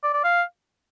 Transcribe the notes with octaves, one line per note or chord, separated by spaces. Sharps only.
D5
D5
F5